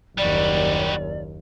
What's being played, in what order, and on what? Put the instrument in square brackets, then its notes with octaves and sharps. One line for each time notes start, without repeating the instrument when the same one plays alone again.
[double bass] F#1 D#2 [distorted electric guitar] G3 F#4 [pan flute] D5